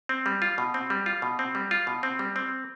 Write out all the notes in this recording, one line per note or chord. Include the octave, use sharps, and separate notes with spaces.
C4
G3
F4
B2
C4
G3
F4
B2
C4
G3
F4
B2
C4
G3
C4